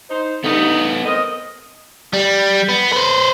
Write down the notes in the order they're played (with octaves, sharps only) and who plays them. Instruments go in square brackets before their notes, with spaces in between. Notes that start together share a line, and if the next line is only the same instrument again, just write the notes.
[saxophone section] D#4 C5
[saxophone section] G2 G3 D#4 [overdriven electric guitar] A3 B3
[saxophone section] C4 A#4 D#5
[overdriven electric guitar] G3
B3
B4 C5